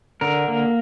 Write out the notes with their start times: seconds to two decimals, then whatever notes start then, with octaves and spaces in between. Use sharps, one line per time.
0.21 D3 A#4
0.48 A#3